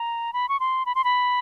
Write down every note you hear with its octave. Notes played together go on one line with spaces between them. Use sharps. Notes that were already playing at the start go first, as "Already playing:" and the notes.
Already playing: A#5
B5
C#6
C6
B5
C6
B5